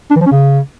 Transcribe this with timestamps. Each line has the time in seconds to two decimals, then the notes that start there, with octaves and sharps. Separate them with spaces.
0.11 D4
0.16 E3
0.21 F3
0.26 C#4
0.32 C#3